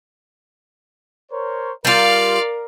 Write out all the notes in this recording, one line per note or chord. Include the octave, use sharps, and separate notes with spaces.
A#4 C5 C#5
G3 F4 A#4 D5 F5